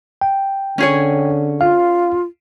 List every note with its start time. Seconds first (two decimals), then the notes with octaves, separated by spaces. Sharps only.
0.21 G5
0.78 D3 C#4 G#4 C#5
1.61 F4 F5